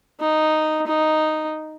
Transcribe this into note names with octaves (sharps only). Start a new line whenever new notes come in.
D#4
D#4